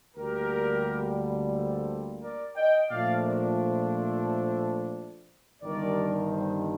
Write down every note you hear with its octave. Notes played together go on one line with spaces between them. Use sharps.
D2 D3 G3 A#3 G4 A#4
A4 C5
A#4 D5
D#5 G5
A#2 F3 A3 D4 F4 D5 F5
A#4 D5
A4 C5
G1 G2 D#3 G3 A#4 D5
C5 D#5